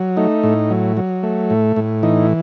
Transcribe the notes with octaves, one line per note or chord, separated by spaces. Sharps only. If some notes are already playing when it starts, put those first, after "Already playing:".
Already playing: F#3
A3 D#4
A2
F#3
F#3
A3
A2
A2
E3 D#4